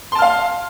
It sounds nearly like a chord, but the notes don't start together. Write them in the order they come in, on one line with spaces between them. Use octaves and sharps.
C6 A5 F6 F5